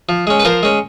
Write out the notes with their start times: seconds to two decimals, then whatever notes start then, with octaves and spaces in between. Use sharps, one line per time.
0.09 F3
0.27 G#3 C#4
0.40 B4
0.45 F3 A#4 C5
0.63 G#3 C#4